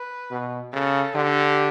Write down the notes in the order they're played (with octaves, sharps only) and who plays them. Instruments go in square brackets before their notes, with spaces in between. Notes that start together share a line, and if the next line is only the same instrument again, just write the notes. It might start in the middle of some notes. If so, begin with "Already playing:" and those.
Already playing: [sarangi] B4
[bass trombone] B2
[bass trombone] C#3 [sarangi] A4
[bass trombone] D3 [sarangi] G4